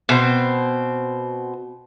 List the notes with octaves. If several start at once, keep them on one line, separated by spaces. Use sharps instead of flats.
B2 C4